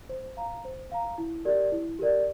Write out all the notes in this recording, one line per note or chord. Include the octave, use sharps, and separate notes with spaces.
C5
F5 A#5
C5
F5 A#5
E4
G4 A#4 D5
E4
G4 A#4 D5